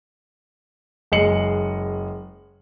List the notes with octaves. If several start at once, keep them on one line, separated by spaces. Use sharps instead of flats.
F#1 G#3 D#5 C7 C#7 F#7